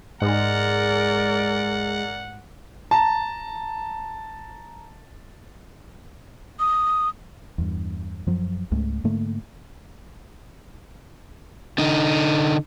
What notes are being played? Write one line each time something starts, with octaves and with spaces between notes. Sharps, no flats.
G#2 G#3 A#4 D5 F#5
A5 A#5
D#6
E2 G2
F#2 F3 F#3
C#2 G#2 G#3 A3
G#2 D3 A3 A#3
D3 D#4